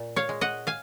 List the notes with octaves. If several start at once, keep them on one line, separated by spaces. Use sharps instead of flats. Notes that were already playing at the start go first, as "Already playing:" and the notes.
Already playing: A#2
C#5 F5
G#3
D#5 F#5
F5 G#5